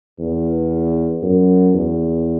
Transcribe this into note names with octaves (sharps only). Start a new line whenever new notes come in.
E2
F#2
E2